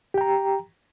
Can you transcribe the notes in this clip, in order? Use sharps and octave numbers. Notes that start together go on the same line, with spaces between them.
G4 G5 A#5